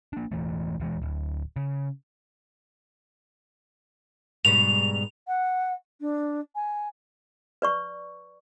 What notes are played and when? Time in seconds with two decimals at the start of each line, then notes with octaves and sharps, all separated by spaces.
0.13 A#3 D4
0.32 E1 E3 A3
0.80 D#1 E3 G#3
1.02 D1
1.56 C#3
4.45 G#2 B2 G3 F7
5.28 F#5
6.01 D4
6.55 G#5
7.62 B4 D5 C#6